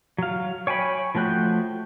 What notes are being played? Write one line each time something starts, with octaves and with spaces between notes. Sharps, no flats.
F#3 F5
C#5 G5 G#5 B5
F3 A3 F#4 G5 F#6